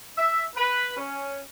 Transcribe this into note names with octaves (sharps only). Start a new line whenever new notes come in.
E5
B4
C#4